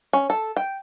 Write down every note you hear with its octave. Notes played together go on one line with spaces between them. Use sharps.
C#4
A4
G5